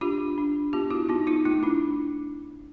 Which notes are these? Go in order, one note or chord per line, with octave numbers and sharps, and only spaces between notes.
D4 F4 G4
D4
B3 F4 G4
E4 F#4
B3 D#4 F4
D#4 F4
A3 D#4 F4
D4 E4